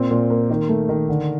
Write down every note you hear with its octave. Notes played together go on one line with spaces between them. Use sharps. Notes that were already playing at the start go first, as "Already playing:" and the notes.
Already playing: A#2 C4
A#2
A#3
D#3
A3
D#3
D3